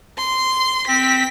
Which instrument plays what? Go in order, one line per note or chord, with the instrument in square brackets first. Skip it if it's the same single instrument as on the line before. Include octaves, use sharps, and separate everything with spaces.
[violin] C6
[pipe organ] C4 [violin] B6